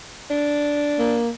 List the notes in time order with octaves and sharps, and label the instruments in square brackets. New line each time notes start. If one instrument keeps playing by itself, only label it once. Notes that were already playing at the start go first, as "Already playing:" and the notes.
[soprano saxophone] D4
[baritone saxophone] A#3